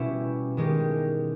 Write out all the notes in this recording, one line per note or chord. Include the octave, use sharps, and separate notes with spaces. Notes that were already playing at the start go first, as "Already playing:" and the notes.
Already playing: B2 G3 C#4 E4 G4
D#3 G#3 C#4 G4